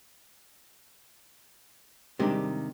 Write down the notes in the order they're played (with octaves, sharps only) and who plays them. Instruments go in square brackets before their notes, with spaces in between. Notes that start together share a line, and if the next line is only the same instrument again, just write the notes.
[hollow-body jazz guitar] C3 D#3 G4 [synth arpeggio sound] G3 G#3 D4